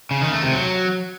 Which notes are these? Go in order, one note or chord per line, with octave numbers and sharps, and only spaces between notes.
C#3
D#3
A3
C3
F#3